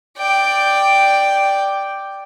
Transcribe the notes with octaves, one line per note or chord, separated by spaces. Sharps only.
D5 G5